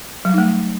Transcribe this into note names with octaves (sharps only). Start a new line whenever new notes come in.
F#3 G3 A3 D#4